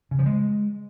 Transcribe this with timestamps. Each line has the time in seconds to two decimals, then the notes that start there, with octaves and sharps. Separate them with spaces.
0.11 C#3
0.19 F3
0.26 G#3